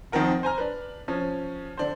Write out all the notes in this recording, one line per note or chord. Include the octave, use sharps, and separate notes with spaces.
F2 D#3 F3 C4 A#4 F#5
C5 G#5 A#5 F6
D4 B4
F3 C#4
D3 D4 C5